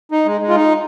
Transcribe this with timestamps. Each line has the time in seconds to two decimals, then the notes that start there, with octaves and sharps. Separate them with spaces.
0.11 D#4
0.26 G#3
0.41 G#3
0.49 F4
0.56 D#4